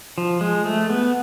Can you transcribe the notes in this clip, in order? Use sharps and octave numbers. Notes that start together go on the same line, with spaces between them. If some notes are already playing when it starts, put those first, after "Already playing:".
F3
G#3
A3
B3